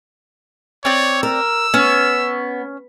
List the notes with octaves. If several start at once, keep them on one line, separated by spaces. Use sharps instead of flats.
C4 C#5 D5
A#4 E6
B3 C#4